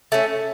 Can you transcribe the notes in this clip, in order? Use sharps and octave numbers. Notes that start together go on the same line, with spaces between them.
A3 C#4